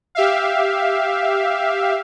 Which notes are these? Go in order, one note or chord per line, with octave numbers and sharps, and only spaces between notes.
G4 E5 F5